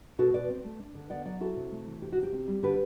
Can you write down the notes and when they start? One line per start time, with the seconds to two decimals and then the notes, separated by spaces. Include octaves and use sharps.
0.19 B2 F#4 A4
0.34 B2 B4 D5
0.49 C4
0.64 A3
0.80 D4
0.95 D3
1.10 B3 D5 F#5
1.25 F#3 D5 F#5
1.41 E4 F#4 A4
1.56 C3
1.71 A3
1.87 E3
2.02 C3 G4
2.12 F#4
2.17 C3
2.23 G4
2.33 C4
2.48 G3
2.63 D3 G4 B4